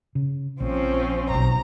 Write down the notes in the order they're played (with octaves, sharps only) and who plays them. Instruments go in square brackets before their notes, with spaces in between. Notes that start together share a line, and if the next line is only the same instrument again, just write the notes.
[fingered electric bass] C#3
[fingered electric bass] A#1 [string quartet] F3 C4 C#4
[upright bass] B1 A#2 [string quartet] A#5